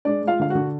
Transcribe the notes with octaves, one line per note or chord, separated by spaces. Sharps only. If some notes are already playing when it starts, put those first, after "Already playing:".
G#3 D4 D5
G#3
F4 F5
D3 F5
D3 F#4 F#5